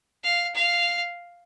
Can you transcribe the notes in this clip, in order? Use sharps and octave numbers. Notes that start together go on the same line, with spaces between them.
F5
F5